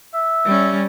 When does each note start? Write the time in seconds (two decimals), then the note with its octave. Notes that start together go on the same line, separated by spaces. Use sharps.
0.14 E5
0.45 G3 C#4